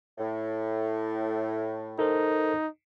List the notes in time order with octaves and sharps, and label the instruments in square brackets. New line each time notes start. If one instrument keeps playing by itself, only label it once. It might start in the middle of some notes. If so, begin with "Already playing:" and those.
[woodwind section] A2
[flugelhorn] D#4 [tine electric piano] A4 A#4 C5